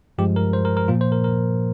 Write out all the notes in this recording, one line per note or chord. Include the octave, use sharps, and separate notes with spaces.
G2 F3 G#3 G4
A#4
C5
A#4
A#4
A#2 F3 A#3 F4
C5
A#4
A#4